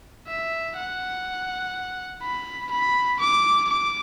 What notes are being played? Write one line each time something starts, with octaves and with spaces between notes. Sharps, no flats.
E5
F#5
B5
B5
D6
D6